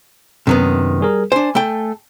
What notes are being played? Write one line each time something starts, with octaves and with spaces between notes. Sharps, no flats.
F#2 C3 D#3 B3
G3 G#4 A#4
D4 C5 G#5
A3 A4 G5